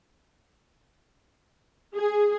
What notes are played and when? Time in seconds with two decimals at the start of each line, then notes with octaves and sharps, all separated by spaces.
1.95 G#4